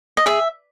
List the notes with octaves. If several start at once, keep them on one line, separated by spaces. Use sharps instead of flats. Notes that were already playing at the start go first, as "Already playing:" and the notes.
D#5
G#4 E5